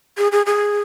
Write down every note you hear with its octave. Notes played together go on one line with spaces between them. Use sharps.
G#4
G#4
G#4